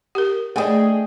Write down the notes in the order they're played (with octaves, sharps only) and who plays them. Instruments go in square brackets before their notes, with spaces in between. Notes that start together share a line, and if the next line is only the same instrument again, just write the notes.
[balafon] G4 A#4
[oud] A3 D4 [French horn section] G#4 [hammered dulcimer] D#5 G5 G#5